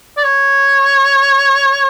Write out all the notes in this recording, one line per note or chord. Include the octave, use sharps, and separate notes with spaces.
D5
C#5